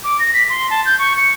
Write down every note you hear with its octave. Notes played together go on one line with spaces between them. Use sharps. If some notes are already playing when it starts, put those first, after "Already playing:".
D6
A#6
B6
C6
A5
G6
C#6
C#7